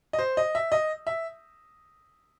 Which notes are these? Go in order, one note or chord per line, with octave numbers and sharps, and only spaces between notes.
D#5
C5
D#5
E5
D#5
E5